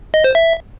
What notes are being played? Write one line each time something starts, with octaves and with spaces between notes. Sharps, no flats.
D#5
C5
E5